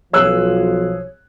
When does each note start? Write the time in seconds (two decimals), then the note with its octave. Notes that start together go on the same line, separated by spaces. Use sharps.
0.13 B1 F3 G#4 C#5 E6 F#6